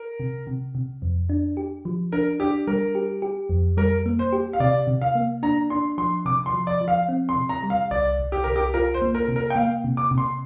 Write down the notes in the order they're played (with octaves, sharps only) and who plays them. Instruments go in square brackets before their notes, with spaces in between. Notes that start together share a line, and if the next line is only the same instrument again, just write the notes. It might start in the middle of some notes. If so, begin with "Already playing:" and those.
Already playing: [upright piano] A#4
[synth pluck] C3
C3
C3
F2
D4
G4
F3
[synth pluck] D4 [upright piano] A#4
[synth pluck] D4 [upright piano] G4
[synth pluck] G3 [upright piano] A#4
[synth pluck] G4
G4
F2
[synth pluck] G3 [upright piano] A#4
[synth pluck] A#3
[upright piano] C5
[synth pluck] G4
[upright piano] F5
[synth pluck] C3 [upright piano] D5
[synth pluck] C3
[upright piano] F5
[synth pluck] A#3
[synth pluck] D4 [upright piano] A#5
[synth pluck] D4 [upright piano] C6
[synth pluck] F3 [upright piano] C6
[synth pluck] C3 [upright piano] D6
[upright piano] C6
[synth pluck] F3
[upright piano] D5
[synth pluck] F3
[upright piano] F5
[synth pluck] C4
[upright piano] C6
[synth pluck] C3
[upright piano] A#5
[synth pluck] G3
[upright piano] F5
[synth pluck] C2 [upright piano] D5
[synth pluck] C2
[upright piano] G4
[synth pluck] C2 [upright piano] A#4
[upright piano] G4
[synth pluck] F4 [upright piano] A#4
[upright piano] C5
[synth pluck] A#3
[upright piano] A#4
[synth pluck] C3
[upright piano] A#4
G5
[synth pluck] A#3 [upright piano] F5
[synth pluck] C3
[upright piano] D6
[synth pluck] C3
[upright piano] C6